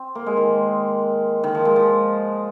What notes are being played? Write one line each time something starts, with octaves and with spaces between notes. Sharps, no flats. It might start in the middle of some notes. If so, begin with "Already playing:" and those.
Already playing: C4
A#3
G#3
D#3
D#3
F3
G#3
F3